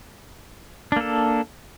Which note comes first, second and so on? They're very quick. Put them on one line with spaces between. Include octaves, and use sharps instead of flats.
D4 A#3 A4